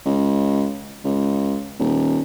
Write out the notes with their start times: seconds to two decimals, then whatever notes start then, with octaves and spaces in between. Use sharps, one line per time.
0.06 C#2
1.05 C#2
1.79 D#1